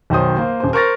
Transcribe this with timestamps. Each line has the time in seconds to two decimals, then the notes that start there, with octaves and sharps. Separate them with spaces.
0.10 B1 D#3 F#3 C5 D#6
0.37 A#3 C5
0.60 D#1 C5
0.73 A#4 C5 C#6 F6 A6 A#6